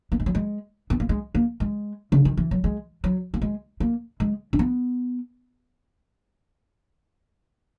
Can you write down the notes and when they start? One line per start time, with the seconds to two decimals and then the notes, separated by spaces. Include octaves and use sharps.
0.12 A#3
0.20 G#3
0.26 F#3
0.35 G#3
0.90 B3
1.00 A#3
1.09 G#3
1.35 A#3
1.60 G#3
2.12 C#3
2.25 D#3
2.37 E3
2.51 F#3
2.64 G#3
3.04 F#3
3.34 A#3
3.42 G#3
3.80 A#3
4.20 G#3
4.53 C#4
4.59 B3